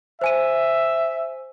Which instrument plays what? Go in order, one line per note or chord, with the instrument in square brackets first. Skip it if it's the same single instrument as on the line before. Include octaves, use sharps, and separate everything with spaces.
[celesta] C5 G#5 D#7 [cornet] E5